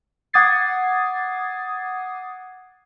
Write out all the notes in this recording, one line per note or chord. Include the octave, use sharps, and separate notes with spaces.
F#5 D6 D#6 G#6 A6 C7